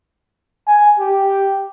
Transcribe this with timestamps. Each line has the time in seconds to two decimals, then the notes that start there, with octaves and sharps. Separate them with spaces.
0.67 G#5
0.99 G4